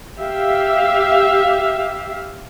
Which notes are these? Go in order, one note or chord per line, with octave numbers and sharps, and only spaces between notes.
G4 E5 F5